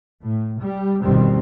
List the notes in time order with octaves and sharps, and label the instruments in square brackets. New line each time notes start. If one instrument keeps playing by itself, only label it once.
[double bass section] A2
G3
G1 F2 B2 D#3 G3 C4